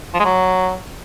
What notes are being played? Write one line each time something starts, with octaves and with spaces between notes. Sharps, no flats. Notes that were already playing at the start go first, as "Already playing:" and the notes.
F3
G#3
F#3